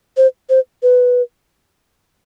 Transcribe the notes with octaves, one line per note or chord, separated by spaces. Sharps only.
C5
C5
B4